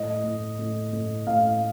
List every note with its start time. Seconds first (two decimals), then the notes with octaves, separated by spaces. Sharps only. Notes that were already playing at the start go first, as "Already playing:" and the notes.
Already playing: A2 D#5
0.24 A2
0.59 A2
0.93 A2
1.27 A2 F5